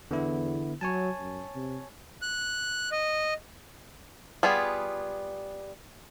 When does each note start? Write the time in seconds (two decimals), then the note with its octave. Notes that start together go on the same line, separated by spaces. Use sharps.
0.11 E2 D3 B3 E4
0.81 F#3 C#5 G#5 A5
1.19 F#2
1.55 C3
2.22 F#6
2.92 D#5
4.43 G3 B3 F4 G#4